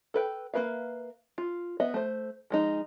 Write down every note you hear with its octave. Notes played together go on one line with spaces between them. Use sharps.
A4 B4 G5
A#3 A4 B4 E5 F5
F4
B3 D#5 E5
A3 C5
F3 G#3 D#4